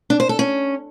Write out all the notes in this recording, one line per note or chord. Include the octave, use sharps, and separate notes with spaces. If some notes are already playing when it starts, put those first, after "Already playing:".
D4
C5
A4
C#4